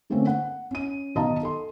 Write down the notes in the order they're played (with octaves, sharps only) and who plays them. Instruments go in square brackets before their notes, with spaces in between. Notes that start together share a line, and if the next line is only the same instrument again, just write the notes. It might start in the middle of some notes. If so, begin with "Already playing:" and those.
[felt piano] D3 A3 A#3 C4 C#4
F#5
C#4 D#7
B1 D#3 D#5 F5 A5 A#5
A4 C6